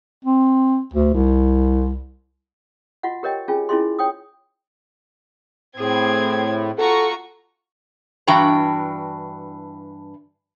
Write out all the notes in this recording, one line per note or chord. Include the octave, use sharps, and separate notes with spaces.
C4
D2
C2
F4 F#4 D#5 F#5
G4 A#4 C#5 D#5 G5
C#4 F4 G#4 G5 G#5
C#4 E4 F4 G#4 D#5 C6
C#5 G5 D#6
A2 C4 G#4 G#6
F4 F#4 A4 A#5 C#6
G2 E3 D4 F#4 G5 A#5